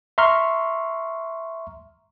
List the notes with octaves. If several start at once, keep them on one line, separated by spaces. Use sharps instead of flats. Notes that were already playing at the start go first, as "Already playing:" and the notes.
E5 A#5 C6 C#6 F6